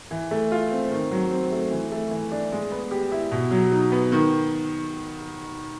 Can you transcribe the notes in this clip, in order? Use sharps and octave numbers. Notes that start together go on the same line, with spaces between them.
E3
A3
F4
C4
D#3
F#3
C4
A3
E3
A3
E3
D4
G#3
B3
G4
E4
B2
F#3
D#4
B3
D#3